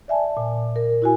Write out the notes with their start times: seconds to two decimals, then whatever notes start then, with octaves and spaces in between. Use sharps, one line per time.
0.08 D5 E5 G#5 A5
0.37 A#2
0.76 A#4
1.02 E4 F#4 G#5